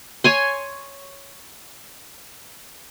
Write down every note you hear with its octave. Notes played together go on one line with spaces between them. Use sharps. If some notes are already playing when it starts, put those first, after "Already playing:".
C#5 G#5 C6